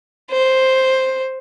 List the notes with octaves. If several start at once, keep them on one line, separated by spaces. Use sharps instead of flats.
C5